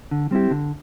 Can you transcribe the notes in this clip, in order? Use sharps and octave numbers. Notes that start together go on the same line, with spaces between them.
D3
G3 C4 E4 G4
D3